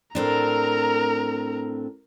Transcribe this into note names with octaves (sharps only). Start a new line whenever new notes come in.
A2 C4 D4 A#4 A#5